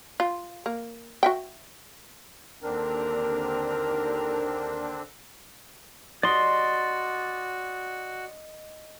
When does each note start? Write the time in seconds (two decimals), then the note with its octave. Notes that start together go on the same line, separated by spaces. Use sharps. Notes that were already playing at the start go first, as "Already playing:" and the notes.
0.20 F4
0.66 A#3
1.23 F#4 E5 G5
2.62 D#2 D3 C4 D4 A#4
6.23 F#4 D5 D#5 C6